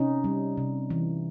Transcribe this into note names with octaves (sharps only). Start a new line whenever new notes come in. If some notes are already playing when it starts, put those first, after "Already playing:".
Already playing: C3 C#4 D#4
G3
C3
E3